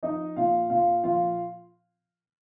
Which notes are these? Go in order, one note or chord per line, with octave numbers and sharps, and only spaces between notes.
F3 D#4 D#5
A#2 F4 F5
A#2 F4 F5
F3 F4 F5